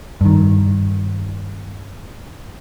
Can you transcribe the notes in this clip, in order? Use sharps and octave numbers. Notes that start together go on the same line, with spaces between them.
G2 D#3